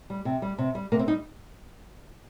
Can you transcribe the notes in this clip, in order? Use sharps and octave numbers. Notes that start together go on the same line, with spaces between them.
G3
C3
G3
C3
G3
C3 A#3
C4
G3 D#4